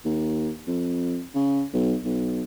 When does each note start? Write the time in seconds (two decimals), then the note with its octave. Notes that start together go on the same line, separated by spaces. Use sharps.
0.05 D#2
0.67 F2
1.35 C#3
1.73 B1
2.05 B1